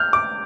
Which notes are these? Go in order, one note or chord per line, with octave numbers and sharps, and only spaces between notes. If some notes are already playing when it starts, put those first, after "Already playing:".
Already playing: F6 G6
D6